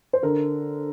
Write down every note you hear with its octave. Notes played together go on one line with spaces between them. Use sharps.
C5
D3 A#4